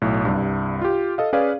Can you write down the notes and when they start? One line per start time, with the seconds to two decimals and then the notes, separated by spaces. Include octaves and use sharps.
0.02 B1 A2
0.25 C2 G2
0.82 F4 G4
1.18 A4 D#5 F5
1.33 C#4 G#4 B4 D5 F5